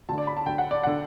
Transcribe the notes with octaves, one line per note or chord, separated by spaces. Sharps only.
D2 D3 A5
D5
B5
A5
D2 D3 G5
F#5
D5
D3 F#5